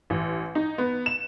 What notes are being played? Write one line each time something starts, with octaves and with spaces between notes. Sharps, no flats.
A1
D#4
B3
E7